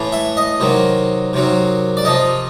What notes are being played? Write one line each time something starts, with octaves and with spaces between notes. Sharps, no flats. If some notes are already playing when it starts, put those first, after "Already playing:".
Already playing: A2 E3
E5
D#5
C3 D#3 F#3
C3 D#3 F#3
D5
C3 F3 D#5